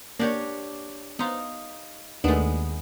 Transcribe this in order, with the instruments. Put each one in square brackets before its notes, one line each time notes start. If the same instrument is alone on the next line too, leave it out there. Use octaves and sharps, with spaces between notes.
[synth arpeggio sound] A#3 [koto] D4 G4 C#5
[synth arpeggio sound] B3 C5 [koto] D#4 F5
[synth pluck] D#2 [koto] G#3 B3 [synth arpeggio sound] A3 D4